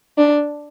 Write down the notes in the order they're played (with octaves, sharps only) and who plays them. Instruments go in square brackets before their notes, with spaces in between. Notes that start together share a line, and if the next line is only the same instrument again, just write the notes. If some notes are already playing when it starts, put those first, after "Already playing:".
[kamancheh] D4